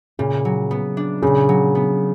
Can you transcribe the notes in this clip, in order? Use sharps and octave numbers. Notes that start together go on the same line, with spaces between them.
A#2 C#3
F#3
B3
D4
A#2 C#3
F#3
B3